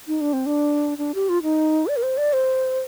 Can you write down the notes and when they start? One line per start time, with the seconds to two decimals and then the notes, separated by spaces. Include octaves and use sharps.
0.08 D#4
0.21 D4
0.33 C4
0.46 D4
0.98 D4
1.15 G4
1.29 F4
1.43 D#4
1.87 D5
1.97 A#4
2.03 C5
2.17 D5
2.33 C5